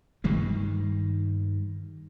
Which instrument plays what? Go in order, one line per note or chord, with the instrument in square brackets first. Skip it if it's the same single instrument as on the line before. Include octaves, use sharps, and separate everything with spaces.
[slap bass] G2 D#3 G3 G#3